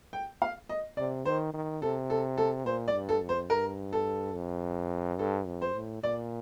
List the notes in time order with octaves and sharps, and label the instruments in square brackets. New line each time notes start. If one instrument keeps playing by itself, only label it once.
[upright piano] G5
F5
D#5
[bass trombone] C3 [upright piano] D5
[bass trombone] D#3 [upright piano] C5
[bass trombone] D#3
[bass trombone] C3 [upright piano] A4
[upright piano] A4
A4
[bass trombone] A#2 [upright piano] C5
[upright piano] D5
[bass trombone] G2
[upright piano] A4
[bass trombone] F2
[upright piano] C5
[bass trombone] G2 [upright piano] A#4
[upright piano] A4
[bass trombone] F2
[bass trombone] G2 [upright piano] A4
[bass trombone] F2
[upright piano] C5
[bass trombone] A2
[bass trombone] A#2 [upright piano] D5